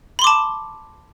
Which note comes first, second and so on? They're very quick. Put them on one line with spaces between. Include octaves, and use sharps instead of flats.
B5 C6 D6 A5